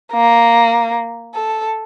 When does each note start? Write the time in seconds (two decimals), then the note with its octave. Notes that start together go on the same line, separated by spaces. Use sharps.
0.13 A#3
1.34 A4